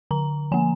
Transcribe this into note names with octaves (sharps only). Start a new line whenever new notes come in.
D3 A#5
F3 A#3 G#5